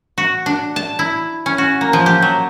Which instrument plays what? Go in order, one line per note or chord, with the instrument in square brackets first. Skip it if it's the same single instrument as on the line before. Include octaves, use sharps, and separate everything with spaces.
[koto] F#4
D4
A5
E4
C#4
F#4
A#3
F3
G4
F#3